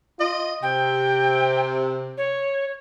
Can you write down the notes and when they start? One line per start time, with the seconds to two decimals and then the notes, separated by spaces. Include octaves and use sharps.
0.19 F4 D#5
0.63 C3 G5
2.18 C#5